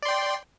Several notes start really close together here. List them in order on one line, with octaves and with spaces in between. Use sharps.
D5 C6 G5